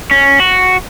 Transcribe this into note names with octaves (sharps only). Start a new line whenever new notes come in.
C#4
F#4